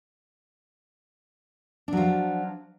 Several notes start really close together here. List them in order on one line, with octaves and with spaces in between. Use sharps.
D4 F#3 F3